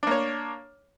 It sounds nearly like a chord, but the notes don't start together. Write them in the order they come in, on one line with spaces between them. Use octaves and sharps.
D4 A#3 C#5